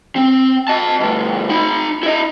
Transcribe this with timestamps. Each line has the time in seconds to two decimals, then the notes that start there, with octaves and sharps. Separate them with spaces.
0.16 C4
0.68 D#5 A5
1.00 D2 G2
1.50 D#4 B5
2.03 E4 D#5